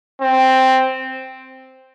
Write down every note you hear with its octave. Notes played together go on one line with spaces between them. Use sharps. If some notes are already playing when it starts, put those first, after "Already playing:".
C4